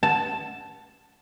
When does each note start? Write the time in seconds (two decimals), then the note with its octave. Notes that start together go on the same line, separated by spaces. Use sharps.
0.03 A5